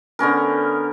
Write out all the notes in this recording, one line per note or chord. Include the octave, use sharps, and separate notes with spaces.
D3 B3 C#4 A#4